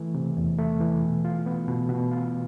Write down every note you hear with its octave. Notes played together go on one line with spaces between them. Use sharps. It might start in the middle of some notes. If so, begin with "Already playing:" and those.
Already playing: E3 A3
C3
E2
A3
E3
B2
F4
B3
B2
B2
F4